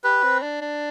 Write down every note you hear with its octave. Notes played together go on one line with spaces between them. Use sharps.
G4 B4
C4
D4
D4